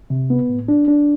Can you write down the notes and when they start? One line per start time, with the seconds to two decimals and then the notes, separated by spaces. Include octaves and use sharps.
0.10 C3
0.30 B3
0.49 A2
0.68 D4
0.88 D4